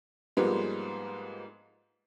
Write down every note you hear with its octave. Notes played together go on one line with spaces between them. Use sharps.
G#2 F3 G3 G#3 A#3 B3